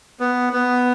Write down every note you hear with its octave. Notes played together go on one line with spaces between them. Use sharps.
B3
B3